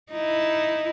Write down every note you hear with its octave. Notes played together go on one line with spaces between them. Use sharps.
D#4 E4